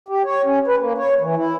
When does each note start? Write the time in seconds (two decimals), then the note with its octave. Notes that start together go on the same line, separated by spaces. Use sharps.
0.08 G4
0.25 C#5
0.45 C#4
0.67 B4
0.79 A#3
0.98 C#5
1.21 E3
1.36 E4